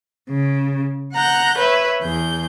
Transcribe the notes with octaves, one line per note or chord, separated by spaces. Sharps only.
C#3
F#5 A#5 F#6 G6
B4 C#5 E5
E2 G#4 G6